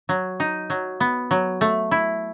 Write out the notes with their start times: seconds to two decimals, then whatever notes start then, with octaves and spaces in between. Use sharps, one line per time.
0.09 F#3
0.40 D#4
0.70 F#3
1.00 B3
1.31 F#3
1.61 A3
1.91 E4